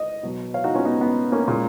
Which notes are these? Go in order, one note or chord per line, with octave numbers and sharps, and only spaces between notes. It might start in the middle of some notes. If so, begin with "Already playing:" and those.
Already playing: D#5
B2 F#3
C#5 F5
D#4 F#4
C#4 F4
B3 D#4
B3
A#3 C#4
A#2 G#3